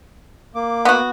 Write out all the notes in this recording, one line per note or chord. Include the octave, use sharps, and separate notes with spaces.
A#3 D6
B3 F#4